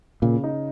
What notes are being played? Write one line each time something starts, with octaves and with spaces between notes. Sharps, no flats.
A#2 C#3
D#4